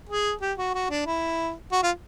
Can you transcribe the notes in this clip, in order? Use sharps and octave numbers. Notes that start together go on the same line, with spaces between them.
G#4
G4
F#4
F#4
D4
E4
F#4
F4